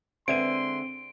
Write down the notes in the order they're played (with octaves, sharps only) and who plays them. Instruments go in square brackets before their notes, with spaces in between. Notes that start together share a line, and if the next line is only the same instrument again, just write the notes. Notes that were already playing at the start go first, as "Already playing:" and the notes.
[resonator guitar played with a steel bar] D3 G#3 E5 [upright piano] C4 B4 D#7 [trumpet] C6 [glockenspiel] D7